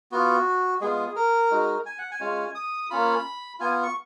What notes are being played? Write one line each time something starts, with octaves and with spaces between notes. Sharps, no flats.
B3 F4 F#4
G#3 B3 F4 G#4
A#4
G#3 D#4 F#4
G#5
F#5
G#5
G#3 C#4 F4
D#6
A#3 C#4 F4 B5
B3 F4 G#5
C#6